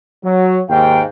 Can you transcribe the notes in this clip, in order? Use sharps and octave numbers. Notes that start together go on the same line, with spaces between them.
F#3
D#2 G#2 F5 G5